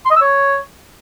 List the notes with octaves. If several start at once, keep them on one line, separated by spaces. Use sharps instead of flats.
C6
D#5
E6
C#5